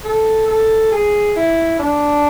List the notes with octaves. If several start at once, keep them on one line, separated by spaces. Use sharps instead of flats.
A4
A4
G#4
E4
D4